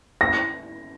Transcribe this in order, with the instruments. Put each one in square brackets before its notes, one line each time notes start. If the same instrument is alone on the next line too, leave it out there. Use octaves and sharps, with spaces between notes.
[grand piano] A#6